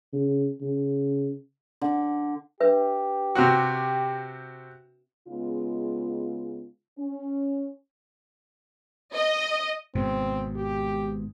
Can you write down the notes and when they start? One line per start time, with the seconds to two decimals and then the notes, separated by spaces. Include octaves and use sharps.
0.13 C#3
0.61 C#3
1.81 D3
2.60 D4 G4 B4 E5
3.35 C3 C4 F#4
5.28 C#3 G#3 B3 D#4 F4
6.98 C#4
9.13 D#5
9.95 G#1 G#2 B2 C4
10.56 G4